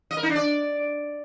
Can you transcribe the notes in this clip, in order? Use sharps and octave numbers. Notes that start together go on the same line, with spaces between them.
D#5
A#4
D#4
D4
D5